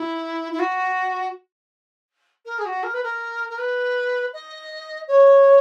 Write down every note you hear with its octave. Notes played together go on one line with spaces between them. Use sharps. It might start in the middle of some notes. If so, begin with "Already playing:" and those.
Already playing: E4
E4
F#4
A#4
G#4
F#4
A#4
B4
A#4
A#4
B4
D#5
C#5